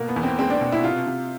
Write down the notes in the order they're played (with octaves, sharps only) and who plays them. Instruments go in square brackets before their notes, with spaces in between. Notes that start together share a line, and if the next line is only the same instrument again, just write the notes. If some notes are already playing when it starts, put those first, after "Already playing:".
Already playing: [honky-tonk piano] B2 [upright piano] A#3
[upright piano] B3
[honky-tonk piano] E2
[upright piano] C4
[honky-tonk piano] G#3 [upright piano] C4
[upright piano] D4
[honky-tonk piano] B2
[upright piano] E4
[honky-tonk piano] C3 [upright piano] F4
[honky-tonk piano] C3